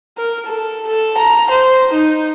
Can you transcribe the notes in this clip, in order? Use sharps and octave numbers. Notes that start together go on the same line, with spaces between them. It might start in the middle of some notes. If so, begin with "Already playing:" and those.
A#4
A4
A4
A#5
C5
D#4